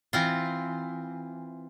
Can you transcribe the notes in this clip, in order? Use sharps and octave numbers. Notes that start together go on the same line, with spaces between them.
E3 C4 F4